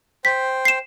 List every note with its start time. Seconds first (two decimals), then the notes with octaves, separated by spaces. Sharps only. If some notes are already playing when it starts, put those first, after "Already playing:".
0.25 C5 G5 B6
0.65 C7 E7